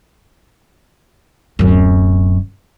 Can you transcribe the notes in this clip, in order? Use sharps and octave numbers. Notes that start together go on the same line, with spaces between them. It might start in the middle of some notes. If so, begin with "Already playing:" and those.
D1 F#2